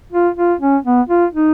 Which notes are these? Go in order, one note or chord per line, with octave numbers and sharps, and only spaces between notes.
F4
F4
C#4
B3
F4
D#4